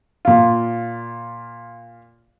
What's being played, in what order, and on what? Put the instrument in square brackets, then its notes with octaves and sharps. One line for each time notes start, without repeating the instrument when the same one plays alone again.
[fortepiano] A#2 F4